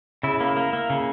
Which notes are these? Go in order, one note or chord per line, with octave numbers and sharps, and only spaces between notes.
C#3 E4
A#3
A#3
A#3
C#3